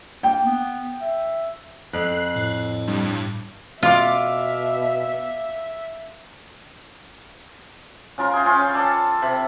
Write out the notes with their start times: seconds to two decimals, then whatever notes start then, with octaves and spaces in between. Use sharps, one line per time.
0.23 A#3 G5
0.46 B3
1.01 E5
1.93 F2 F#6 C7
2.36 A2
2.87 G2
3.83 B2 F4 E5 F5 D6
8.18 C#3 F4 A#4
8.33 G#4 G5
8.45 C#4 F4
8.74 A4 D5
9.22 C3 B5